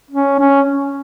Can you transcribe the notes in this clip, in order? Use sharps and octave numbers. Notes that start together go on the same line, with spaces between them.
C#4
C#4